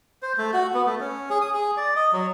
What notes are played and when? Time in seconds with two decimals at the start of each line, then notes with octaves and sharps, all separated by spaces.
0.22 C5
0.38 A3
0.53 F#4
0.74 B3
0.86 A3
1.00 C#4
1.30 G#4
1.41 D#6
1.54 G#4
1.77 D5
1.96 D#5
2.13 F#3